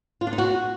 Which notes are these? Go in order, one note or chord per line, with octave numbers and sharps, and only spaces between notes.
F4
D4
D#4
F#4